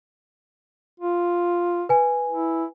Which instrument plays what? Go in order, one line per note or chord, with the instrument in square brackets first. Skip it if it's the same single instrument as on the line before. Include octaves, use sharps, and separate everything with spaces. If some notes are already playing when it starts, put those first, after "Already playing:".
[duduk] F4
[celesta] B4 G#5
[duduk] E4